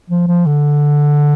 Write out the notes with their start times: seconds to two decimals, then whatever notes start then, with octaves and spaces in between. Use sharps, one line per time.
0.10 F3
0.27 F3
0.46 D3